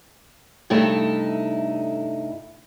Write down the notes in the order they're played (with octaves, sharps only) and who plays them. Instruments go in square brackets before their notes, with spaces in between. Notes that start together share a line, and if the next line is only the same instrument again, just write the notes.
[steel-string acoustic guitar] G2 C3 A3 D#4 E4